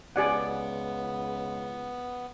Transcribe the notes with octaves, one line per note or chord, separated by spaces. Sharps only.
C#2 B3 G#4 D5 F#5